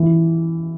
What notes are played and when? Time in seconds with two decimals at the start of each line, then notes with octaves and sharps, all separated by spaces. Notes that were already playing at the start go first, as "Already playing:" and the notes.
Already playing: E3